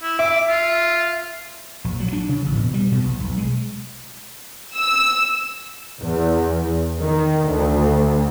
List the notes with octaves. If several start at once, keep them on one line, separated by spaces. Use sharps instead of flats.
E4
E5 D6
F4
A#1
F#3
D4
C#3
A1
B2
G3
B2
B1
B1
G#3
E6
E2
D#3
D2